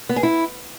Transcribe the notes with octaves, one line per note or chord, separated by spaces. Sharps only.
B3
G#4
E4